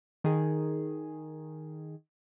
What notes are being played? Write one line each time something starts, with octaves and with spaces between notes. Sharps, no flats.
D#3 G#4